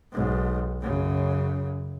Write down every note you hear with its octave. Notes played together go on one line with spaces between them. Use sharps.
B1 G#2
F#2 C#3